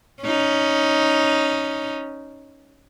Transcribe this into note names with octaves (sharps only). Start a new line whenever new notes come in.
C#4 D#4